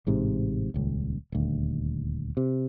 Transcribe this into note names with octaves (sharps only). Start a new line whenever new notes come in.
A1 G#2 C3
D#1 C#2
D#1 D2
C3